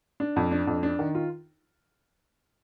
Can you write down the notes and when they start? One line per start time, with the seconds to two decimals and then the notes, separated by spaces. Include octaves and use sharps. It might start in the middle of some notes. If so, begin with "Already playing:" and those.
0.20 D4
0.36 F2
0.51 D4
0.67 F2
0.83 D4
0.99 D#3
1.15 F4